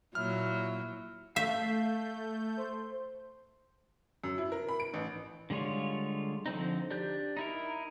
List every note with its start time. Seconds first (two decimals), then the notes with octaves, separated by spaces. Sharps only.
0.15 A#2 F#3 E4 F6
1.36 A3 E5 F5 G6
2.57 C5
4.24 F#2
4.38 E4
4.52 A#4
4.69 B5
4.80 D7
4.94 A1
5.50 D3 G3 G#3 F4 C#5
6.46 D3 F3 C4 D#4
6.91 D4 G4 G6
7.37 D#4 E4 A#4